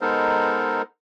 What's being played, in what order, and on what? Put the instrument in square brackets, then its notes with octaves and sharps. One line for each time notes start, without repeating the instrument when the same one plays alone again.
[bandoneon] G#3 B3 D#4 A4 A#4 C5